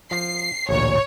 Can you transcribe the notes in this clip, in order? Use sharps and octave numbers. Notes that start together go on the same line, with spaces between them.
F3 C7
A1 D2 A#2 C#5